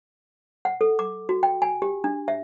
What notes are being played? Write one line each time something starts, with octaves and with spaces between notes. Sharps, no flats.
F#5
A4
D6
F#4
G5
G#5
G4
D4
E5